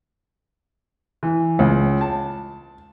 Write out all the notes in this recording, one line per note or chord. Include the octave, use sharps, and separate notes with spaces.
E3
C#2
A5